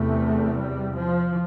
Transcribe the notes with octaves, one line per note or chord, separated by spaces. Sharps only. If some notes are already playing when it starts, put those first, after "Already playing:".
Already playing: E2 C3 A3
G3
F3